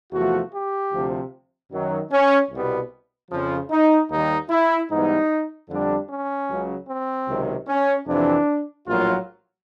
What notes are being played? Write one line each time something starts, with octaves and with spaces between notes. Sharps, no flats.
E2 C3 F3 A3 F#4
G4
D2 C3 F3
F#2 D#3 F#3
C#4
C2 B2 G3 B3
F2 C#3 F3
D#4
D#2 D#3 G3 D#4
E4
G#2 E3 G3 B3 D#4
F2 D3 G3 D4
C#4
C#2 C#3 F#3
C4
C#2 C3 D#3 F#3
C#4
F2 C3 E3 D4
A#1 A2 F#3 A#3 F4